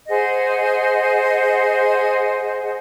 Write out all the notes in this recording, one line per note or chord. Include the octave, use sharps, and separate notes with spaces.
G#4 C5 D#5 F#5